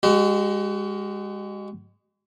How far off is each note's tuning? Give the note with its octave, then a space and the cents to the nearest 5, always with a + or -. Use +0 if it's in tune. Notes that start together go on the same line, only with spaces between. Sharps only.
G#3 -25 F#4 +35